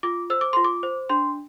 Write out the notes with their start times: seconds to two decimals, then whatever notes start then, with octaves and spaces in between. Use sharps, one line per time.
0.03 F4 D6
0.30 C5 E6
0.41 D6
0.53 F4 C6
0.65 D6
0.83 C5
1.09 D4 C6